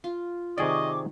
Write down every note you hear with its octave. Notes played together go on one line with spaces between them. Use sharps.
F4
C3 D#3 G#4 D5 D#5 C#6 D6